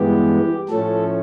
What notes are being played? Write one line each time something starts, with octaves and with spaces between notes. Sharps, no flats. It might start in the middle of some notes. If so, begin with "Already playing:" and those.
Already playing: G2 E3 G#3 B3 G4
A2 F3 A3 C#4 A4